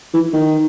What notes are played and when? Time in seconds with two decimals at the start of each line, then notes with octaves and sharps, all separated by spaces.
0.14 E3
0.33 D#3